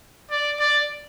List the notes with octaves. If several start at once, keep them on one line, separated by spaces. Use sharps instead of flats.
D5
D5